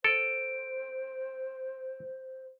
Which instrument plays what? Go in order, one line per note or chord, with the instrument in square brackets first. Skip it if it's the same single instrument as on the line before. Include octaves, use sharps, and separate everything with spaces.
[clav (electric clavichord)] A4 [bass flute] C5 [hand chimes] D7